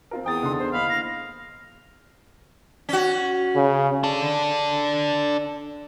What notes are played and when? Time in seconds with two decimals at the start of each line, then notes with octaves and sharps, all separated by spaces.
0.11 C4 F4 A#4
0.26 E2 G5 D#6 A6
0.43 D3 D#4 C6
0.59 C5
0.73 A#3 D#5 F5 B5
0.89 A#6
2.89 C#4 F#4
3.56 C#3
4.04 D4 A4